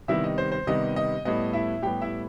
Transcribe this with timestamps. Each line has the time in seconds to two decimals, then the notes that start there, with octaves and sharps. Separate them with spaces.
0.08 C3 D#3 G3 B3 E4 E5
0.24 D#5
0.38 C5
0.52 C5
0.67 C3 D#3 G3 B3 D#5
0.96 D#5
1.25 A2 G3 B3 D#5
1.53 E4 E5
1.82 A2 G3 B3 G4 G5
2.02 E4 E5